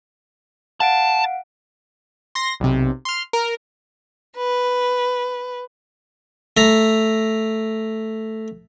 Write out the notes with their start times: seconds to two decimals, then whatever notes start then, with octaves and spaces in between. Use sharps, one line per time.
0.80 F5 F#5 A5 D7
2.35 C6 A#6
2.60 B1 C3
3.05 C6 F6
3.33 A#4
4.37 B4
6.57 A3 A#5